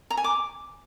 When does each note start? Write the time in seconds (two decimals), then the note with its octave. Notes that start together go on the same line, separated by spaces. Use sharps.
0.10 A#5
0.17 G#5
0.24 D6